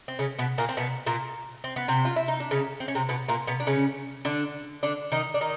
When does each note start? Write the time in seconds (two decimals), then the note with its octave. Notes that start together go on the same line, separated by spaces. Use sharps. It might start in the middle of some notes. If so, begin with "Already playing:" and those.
0.08 C4
0.19 C#3 C#4
0.39 B2 B3
0.58 A#2 A#3
0.69 C4
0.77 B2 B3
1.06 A#2 A#3
1.64 C4
1.76 B3
1.88 C3 C4
2.05 F4
2.16 E4
2.28 D#4
2.40 D4
2.51 C#3 C#4
2.80 C4
2.88 C#4
2.95 C3 C4
3.09 B2 B3
3.28 A#2 A#3
3.47 B2 B3
3.60 D4
3.67 C#3 C#4
4.25 D3 D4
4.83 D3 D4
5.12 D#3 D#4
5.34 D4
5.41 D#3 D#4